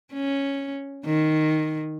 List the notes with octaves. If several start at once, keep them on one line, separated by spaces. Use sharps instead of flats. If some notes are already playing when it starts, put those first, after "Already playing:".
C#4
D#3